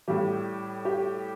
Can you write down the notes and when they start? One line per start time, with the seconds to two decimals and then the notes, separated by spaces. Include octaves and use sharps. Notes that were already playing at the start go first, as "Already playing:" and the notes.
0.08 A2 G3 G4
0.85 G4